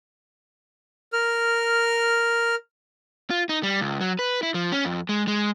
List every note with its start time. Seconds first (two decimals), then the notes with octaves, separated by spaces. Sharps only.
1.13 A#4 F6
3.30 F4
3.49 D#4
3.63 G3
3.81 C#2
4.01 F#3
4.19 B4
4.43 E4
4.54 F3
4.72 C#4
4.85 F2
5.09 G#3
5.28 G#3